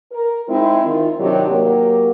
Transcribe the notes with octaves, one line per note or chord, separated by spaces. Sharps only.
A#4
G#3 C4 D#4 E4
D#3 F4
C3 D#3 F#3 D4 F#4 G4
F#3 A#3 G4